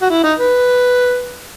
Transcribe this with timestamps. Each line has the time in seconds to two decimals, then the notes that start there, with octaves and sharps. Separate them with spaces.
0.02 F#4
0.10 E4
0.24 D#4
0.39 B4